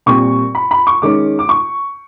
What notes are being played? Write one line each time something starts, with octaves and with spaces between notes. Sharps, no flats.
A#2 G3 C4 C#6
B5
B5
C#6
D#3 G#3 C#4 D6
D6
C#6